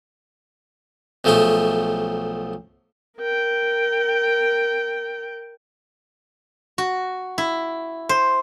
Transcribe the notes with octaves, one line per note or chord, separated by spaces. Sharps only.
B1 F3 A3 G#4 C6 C#6
A#4 G5
F#4
E4
C5